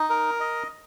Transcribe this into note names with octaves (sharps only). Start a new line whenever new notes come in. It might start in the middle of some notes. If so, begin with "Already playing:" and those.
Already playing: D#4
A#4
D#5